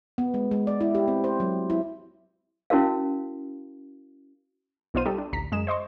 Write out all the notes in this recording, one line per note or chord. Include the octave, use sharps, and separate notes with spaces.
B3
G#3
G#3
D5
E4
G4
C4
C5
F#3
E4
C#4 E4 F#4 A#4 F5
B1 B3 D#4 F4 C5 D#7
G3 D#4 G4 A4
D4
A1 D2 A#5 B6
F#2 G#3 G#4 D#5 E7
C5 D#5 C6 C#6